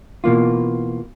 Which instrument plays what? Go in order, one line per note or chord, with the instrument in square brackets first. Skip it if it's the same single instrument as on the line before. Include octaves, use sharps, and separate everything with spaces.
[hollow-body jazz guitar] B2 E3 A#3 F4